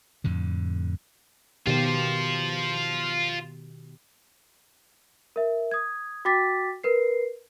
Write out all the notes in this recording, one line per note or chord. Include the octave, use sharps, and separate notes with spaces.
F2 A2 D3
B2 D#3 F4 G4 C5
A#4 E5
D#6 G#6
F#4 G5 D6 A6 B6
A#4 B4 C7